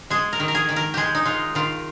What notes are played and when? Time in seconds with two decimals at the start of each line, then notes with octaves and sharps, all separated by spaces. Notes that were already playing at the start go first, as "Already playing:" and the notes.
0.10 G#3 G#4
0.33 A#4
0.40 D#3
0.48 A#4
0.55 G#4
0.69 D#3
0.76 A#4
0.94 G#3 G4 G#4
1.15 D#4
1.26 G#3 F4
1.55 D#3 F4